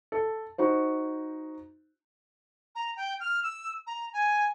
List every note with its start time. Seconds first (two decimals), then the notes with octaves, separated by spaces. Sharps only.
0.12 A4
0.58 D#4 F#4 C5
2.75 A#5
2.96 G5
3.20 F6
3.43 E6
3.86 A#5
4.13 G#5